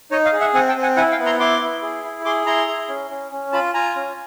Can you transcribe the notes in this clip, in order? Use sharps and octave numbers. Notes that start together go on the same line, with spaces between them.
D#4 C#5 D#5
D#5 F5
G#4
E5 F#5
C4 F#5 G#5
G5 A5
C4
F#5 G#5
E4 F#5 G#5
F5 G5
B3
A#5 C6
E4 C6 D6
E4
G#4
E4
G#4 C6 D6
E4 A#5 C6
G#4
C#4
C#4
C#4
F4 A5 B5
F4 G#5 A#5
C#4